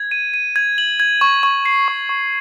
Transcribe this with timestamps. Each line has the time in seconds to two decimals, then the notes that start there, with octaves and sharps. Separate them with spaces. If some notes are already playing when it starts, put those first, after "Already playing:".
Already playing: G#6
0.11 D#7
0.34 D#7
0.56 G#6
0.78 F#7
1.00 G#6
1.21 C#6
1.43 C#6
1.66 C7
1.88 C#6
2.09 C#6